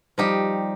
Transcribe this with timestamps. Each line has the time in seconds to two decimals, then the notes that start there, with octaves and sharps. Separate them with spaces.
0.18 F3 G3 D#4 G4